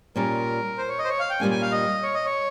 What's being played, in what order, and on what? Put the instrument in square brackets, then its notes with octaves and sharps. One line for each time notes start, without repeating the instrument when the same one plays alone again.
[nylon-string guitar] A#2 G3 C#4 F4 [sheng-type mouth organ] A#4
[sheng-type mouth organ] C5
C#5
D#5
C5
C#5
F5
G5
[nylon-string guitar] A#2 G3 A#3 C#4 [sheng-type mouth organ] G#5
[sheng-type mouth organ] G#5
F5
D#5
C#5
D#5
C#5